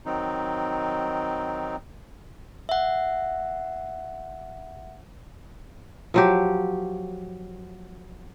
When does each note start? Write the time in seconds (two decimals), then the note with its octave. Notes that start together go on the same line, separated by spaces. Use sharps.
0.05 D#3 F#3 C4 D#4
2.69 E5 F#5
6.14 F3 F#3 G4